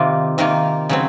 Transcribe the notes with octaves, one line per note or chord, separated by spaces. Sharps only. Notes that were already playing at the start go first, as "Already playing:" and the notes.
Already playing: C3 D#3 A#3 F4
C3 D#3 A#3 F4
C#3 F#3 C4